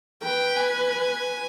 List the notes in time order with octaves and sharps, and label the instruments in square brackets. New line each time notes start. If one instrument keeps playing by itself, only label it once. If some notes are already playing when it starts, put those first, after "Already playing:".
[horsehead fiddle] B4 [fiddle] G5
[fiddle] G#5